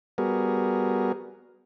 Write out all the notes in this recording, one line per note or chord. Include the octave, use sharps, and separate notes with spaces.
G3 B3 F#4 G#4 A#4